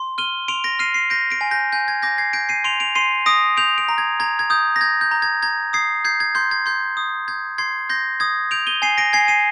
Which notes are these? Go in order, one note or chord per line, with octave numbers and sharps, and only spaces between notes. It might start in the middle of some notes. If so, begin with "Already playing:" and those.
Already playing: C6
F6 D#7 G7
C6 D7 F7
A#6 D7
F6 C7 D#7
C7 D#7
G6 A#6 D7
A#6 D7
G#5
G6 A#6
G#5 G6
G#6
D6 G6 A#6
G#6 C7
G6 A#6 D7
C7 D#7
C6 D7 F7
D7 F7
C6 C7 D#7
D#6 A#6 D7
G6 D7 F7
D7 F7
A#5
G#6
A#5 G#6
G#6
D#6 G6
A#6
G6 G#6
G6
A#5
G#6
A#5 G#6
D#6 G#6 C7
G6 G#6 C7
G#6
C6 G6
G#6
C6 G6
D#6
G6 G#6
C6 G#6 C7
C6 G6 A#6
D#6 G#6
G6 D7 F7
D#7 G7
G#5 C7 D#7
A#6 D7
G#5 G#6 C7
C7 D#7